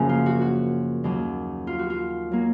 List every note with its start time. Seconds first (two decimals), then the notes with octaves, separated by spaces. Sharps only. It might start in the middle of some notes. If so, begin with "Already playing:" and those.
Already playing: F#2 C#3 F3 A#3
0.09 F4
0.26 F#4
0.41 F#4
1.04 D#2 D#3 F#3
1.67 F4
1.79 F#4
1.90 F4
2.31 F#3 A#3